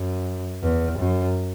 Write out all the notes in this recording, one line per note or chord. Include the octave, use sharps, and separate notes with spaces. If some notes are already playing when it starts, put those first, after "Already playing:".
Already playing: F#2
E2
F#2